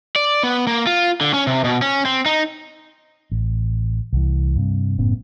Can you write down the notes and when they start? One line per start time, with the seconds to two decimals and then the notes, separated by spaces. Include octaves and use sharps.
0.16 D5
0.43 B3
0.67 A#3
0.87 F4
1.21 D3
1.34 C#4
1.47 C3
1.64 B2
1.82 C#4
2.05 C4
2.26 D#4
3.32 A1
4.13 C2 E3
4.56 G2 C3
4.98 F#1 A2 B3 C#4